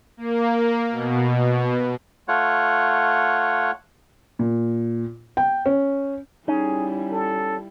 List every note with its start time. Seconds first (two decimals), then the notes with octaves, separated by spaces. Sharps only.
0.17 A#3
0.90 B2
2.28 A3 F4 C#5 F#5
4.39 A#2
5.37 G5
5.66 C#4
6.48 G3 C#4 D#4 E4 G#4
7.12 A4